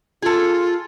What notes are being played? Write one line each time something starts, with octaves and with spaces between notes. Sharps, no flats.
F4 G#4 A4